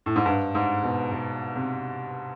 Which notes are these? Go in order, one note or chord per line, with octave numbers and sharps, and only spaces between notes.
A2
G#2
G2
G#2
B2
B2
C3